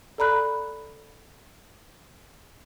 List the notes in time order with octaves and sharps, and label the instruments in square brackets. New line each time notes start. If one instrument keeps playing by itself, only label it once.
[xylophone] A4 D5 A#5 B5 F#6